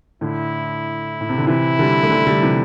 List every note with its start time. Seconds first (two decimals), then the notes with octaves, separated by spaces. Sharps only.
0.21 A2 D3 E4
1.21 A2
1.29 C3
1.38 D3
1.47 C3 E3 E4
1.79 D3 G3
2.03 A3
2.10 D3 G3
2.27 D3 G3
2.42 C3 E3